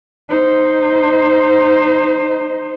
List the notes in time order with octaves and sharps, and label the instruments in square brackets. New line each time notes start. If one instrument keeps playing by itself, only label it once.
[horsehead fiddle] D#4 C5